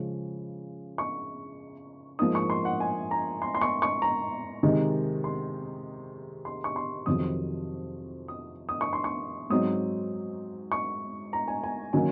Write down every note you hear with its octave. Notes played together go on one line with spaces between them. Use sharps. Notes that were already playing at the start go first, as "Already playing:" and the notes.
Already playing: C#3 F3 G#3 C#4
C#6
G#2 F3 A#3 D#4 D#6
C#6
C6
F#5
G#5
A#5
C6
C6
C#6
C#6
A#5
C3 D#3 G#3 D#4
C6
C6
C#6
C6
F2 C3 D#3 F#3 C4 D#6
D#6
D#6
C#6
C6
C#6
G#2 F#3 C4 D#4 D#6
C#6
A#5
G#5
G#5
D#3 F#3 A#3 C#4 G#5